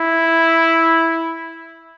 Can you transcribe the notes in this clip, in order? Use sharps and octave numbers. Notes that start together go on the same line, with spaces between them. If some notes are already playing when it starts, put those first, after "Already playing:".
Already playing: E4